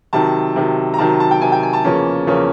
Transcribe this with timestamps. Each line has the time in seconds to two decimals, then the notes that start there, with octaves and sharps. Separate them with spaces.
0.13 C3 D#3 F#3 A5
0.56 C3 D#3 F#3
0.94 A#5
0.98 C3 D#3 F#3 A5
1.20 A5
1.31 G5
1.41 C3 D#3 F#3 G#5
1.52 G5
1.63 G#5
1.73 A5
1.85 E2 C#3 F3 A#3 C#4
2.27 E2 C#3 F3 A#3 C#4